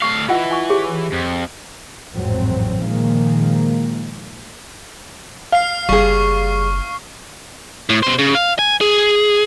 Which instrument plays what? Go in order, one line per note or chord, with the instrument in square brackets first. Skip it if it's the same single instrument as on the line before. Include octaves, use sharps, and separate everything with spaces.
[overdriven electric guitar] A2 F5 [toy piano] C#6
[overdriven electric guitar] E3 [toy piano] F4 D#5 F#5
[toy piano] G#5 C#6
G4 G#4 C#5
[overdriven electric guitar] F2
[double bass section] A1 F2 G#2 F#3 C4
A#2 D#3 F3 G#3 A#3
[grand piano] F5 [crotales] F6 C7
[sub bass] F#1 [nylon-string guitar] G3 G#4 [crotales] C#6
[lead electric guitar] A2
B2 C5
C#3
F5
G#5
G#4